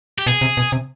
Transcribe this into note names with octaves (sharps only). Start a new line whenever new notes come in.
G4
B2 G#4
C3
B2
C3